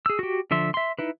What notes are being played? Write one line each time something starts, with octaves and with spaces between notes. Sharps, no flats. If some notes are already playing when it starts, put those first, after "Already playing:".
G#4 E6
F#4 G4
D3 F3 E5 C6
E5 C6
D#4 E4 B4